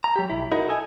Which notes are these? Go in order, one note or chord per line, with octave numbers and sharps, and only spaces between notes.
A#5
F#3 G4
B1 E4
D#4 E4 F#4 A#4
A4 D#5 G#5